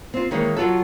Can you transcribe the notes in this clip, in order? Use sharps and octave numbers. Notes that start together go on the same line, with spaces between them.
C4 F4
D#3 E3 G#3 A#3 C#5
F#3 F4 F#4 A4